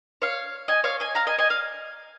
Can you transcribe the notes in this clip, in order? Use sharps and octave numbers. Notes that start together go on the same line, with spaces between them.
C#5 F5
D#5 G#5
C#5 F5
D#5 G#5
F5 A#5
D#5 G#5
D#5 G#5
F5